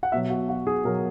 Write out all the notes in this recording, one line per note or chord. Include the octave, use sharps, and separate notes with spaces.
F#5
B2 F#3 E5
F#4
F#4
G#4
B2 F#3 A#4